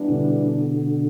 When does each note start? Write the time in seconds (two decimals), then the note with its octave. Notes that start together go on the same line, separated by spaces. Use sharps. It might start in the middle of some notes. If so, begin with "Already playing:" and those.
Already playing: E3 G3 B3 D4
0.09 B2 D3